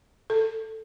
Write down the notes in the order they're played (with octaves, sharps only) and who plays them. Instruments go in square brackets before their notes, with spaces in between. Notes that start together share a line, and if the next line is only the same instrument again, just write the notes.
[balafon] A4